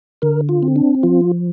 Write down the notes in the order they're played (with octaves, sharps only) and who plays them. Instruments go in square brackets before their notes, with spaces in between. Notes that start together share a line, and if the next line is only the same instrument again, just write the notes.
[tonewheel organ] D3 A#4
F4
C4
D4
F3 F4